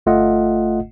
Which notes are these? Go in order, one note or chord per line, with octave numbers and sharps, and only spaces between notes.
G1 A3 F4 D#5 F#5